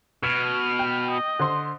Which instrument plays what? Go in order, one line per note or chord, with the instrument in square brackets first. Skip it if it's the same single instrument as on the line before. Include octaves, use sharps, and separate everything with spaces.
[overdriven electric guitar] B2 [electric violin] F6 [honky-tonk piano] G#6 D#7
[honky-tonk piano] G5
[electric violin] D#5
[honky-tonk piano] D3 C5 C6